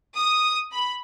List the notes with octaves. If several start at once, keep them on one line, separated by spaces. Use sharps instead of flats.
D#6
B5